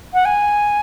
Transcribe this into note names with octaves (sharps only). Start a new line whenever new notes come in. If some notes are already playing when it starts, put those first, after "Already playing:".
F#5
G#5